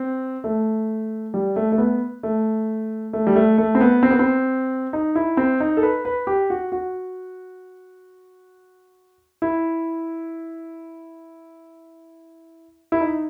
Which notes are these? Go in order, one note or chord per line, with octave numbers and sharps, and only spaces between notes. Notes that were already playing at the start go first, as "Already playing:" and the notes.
Already playing: C4
A3
G3
A3
A3
B3
A3
A3
G3
A3
A3
C4
B3
C4
B3
C4
D#4
E4
C4
D#4
A4
B4
B4
G4
F#4
F#4
E4
E4
D#4